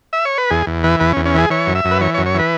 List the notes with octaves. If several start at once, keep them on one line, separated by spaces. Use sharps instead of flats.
E5
C#5
B4
E2 G#4
E2
E3 B4
E2 B4
C#4
E2
C#4
E3 G#4
E3 C#5
F#2
E5
F#2
B4
E3 C#5
C#5
F#2
C#5
E3 B4